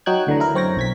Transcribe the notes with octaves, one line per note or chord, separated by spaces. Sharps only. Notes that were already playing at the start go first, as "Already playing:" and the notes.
F#3 D#4 F#4 G5 F#6 G#6
D2 D3 E3 A#5
E4 A#4
F#2 C4 C#5 G5 A#6
B1 G#6 B6